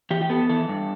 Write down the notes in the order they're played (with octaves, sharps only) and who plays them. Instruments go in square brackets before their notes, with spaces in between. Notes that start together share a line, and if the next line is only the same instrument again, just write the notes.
[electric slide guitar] E3 G4
G4
B3 A4
E3 A4
G2